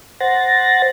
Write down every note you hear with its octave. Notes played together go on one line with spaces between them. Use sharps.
C5 F#5 A6 A#6